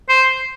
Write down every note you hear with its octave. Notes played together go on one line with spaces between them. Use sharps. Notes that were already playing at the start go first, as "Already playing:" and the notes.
C5